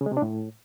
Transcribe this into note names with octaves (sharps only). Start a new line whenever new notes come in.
C#3
G#3
C3
D4
A2